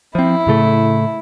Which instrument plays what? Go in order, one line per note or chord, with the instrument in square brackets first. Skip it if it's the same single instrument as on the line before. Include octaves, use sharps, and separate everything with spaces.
[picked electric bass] F3 C4 [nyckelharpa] E4
[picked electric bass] A2 C#3 A3